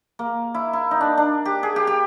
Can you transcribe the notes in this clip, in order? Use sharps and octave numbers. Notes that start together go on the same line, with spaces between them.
A#3
E4
E4
D#4
D4
D4
G4
G#4
G4
G4